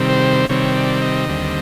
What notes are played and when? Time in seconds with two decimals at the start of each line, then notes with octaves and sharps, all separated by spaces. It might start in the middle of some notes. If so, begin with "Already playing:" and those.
Already playing: C3 D#3 G3 C4
0.09 C5
0.49 C3 D#3 G3 C4 C#5
0.76 D5
1.02 D#5
1.29 D#2 D3 G3 C4